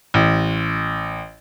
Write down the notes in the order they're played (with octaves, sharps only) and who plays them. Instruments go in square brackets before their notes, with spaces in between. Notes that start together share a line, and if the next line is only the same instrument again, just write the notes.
[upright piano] A1